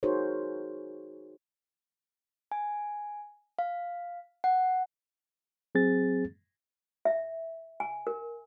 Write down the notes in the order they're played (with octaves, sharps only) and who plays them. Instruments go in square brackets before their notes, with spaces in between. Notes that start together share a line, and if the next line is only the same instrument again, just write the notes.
[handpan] D#4 F#4 G#4 A#4 C5 C#5
[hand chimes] G#5
F5
F#5
[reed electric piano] F#3 C4 G#4 A6
[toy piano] E5
G#5
A#4